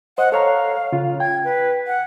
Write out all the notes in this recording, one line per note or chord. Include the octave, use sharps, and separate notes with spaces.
C5 D#5 F#5
A4 C#5 F5 A#5
C#3 F4
G5 G#6
B4
F#5